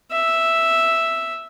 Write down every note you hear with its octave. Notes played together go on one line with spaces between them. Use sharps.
E5